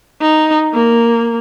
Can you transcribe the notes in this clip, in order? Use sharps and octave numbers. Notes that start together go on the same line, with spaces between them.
D#4
A#3